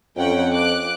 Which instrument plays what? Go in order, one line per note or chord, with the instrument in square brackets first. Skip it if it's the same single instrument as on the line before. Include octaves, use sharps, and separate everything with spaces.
[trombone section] F2 [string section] C#4 F#5 G5
[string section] D6 F#6